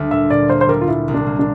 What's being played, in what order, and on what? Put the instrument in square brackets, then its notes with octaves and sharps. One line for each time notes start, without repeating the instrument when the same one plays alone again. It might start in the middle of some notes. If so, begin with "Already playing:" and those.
Already playing: [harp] D2 G3
[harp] A#2 [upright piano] E5
[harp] A#2 [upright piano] D5
[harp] A#3 [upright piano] C5
[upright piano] C5
[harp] G3 [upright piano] A#4
[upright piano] F4
[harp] A#2 [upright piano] E4
[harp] C2
[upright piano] D4
[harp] A#3
[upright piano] D4